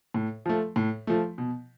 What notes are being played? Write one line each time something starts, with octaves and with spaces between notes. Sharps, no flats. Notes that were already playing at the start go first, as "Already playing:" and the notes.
A2
F3 A3
A2
F3 A3
B2